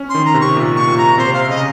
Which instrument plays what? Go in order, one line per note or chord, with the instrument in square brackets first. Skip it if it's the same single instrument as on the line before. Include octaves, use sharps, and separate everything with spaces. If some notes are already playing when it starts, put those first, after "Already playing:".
Already playing: [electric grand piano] C#4
[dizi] C6
[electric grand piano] D#3
[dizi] A#5
[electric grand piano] C3
[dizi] C#6
[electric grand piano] A#2
[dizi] C#6
[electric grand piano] A#2
[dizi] A#5
[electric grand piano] C3 [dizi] C5
[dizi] F5
[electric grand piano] C#3 [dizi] D#5